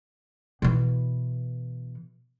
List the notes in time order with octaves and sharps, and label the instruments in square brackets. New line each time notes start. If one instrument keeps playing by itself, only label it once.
[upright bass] B2 E3